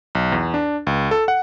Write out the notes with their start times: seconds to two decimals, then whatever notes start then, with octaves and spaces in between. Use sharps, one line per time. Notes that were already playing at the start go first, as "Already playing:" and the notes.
0.15 B1
0.32 E2
0.54 D4
0.87 C#2
1.11 A4
1.28 F#5